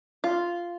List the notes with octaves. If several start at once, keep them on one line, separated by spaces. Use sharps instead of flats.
F4